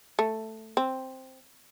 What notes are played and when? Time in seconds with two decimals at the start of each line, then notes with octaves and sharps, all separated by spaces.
0.19 A3
0.77 C4